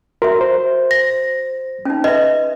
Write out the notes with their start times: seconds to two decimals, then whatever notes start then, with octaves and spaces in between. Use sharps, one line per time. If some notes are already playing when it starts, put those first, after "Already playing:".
0.22 F#4 A#4 E5
0.41 C5
0.91 A#6
1.85 C#4 D#4
2.04 B4 D#5 E5